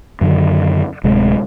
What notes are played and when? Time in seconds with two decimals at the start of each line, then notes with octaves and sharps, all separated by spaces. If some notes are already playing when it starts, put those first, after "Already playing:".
0.21 F#2 D3 D#3
1.04 D1 C3 G#3